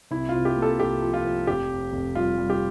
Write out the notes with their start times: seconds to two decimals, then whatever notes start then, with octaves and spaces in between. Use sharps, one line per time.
0.11 C2 E4
0.29 F4
0.34 C3
0.45 G4
0.57 A#3
0.62 A4
0.80 C2 G4
1.02 F3
1.14 F4
1.25 F3
1.47 F1 G4
1.70 F2
1.93 F1
2.15 G3 F4
2.38 G3
2.50 G4